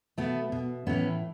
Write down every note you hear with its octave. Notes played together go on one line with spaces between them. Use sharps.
B2 A3 B3
B2
A2 E3 B3 C#4